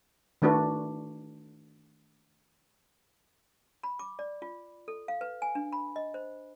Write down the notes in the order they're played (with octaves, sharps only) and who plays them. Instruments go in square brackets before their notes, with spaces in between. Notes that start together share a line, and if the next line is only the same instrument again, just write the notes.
[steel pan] D#3 A3 D4 F#4 B4
[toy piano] B5
D6
D5
F4
A4
F5
B4
G#5
D4
B5
D#5
C5